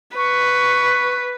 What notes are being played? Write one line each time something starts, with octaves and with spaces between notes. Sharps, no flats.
B4 C#6